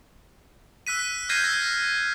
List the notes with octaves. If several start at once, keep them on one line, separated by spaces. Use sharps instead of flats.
E6 F#6 B6 D#7
F6 G6 G#6 A#6 C7 D#7
E6 G#6 A#6